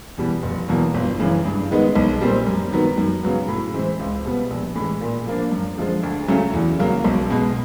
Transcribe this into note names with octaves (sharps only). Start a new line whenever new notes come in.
E2 B2 G3
F1
E2 B2 F#3 A#3
G1
F#2 C#3 E3
G2
D#3 G#3 B3 D#4
B1
A#2 G3 C4
F#2
D#3 F#3 B3
F#2
C#3 F#3 B3
A2
E3 G#3 C4 E4
C#2
B2 G3 B3
A#1
A2 E3 G#3
A#2
F3 A#3 D4
F#2
D3 F3 G#3
D2
C#3 F#3 A3 C#4
E2
C#3 F#3 A#3
B1
B2 G#3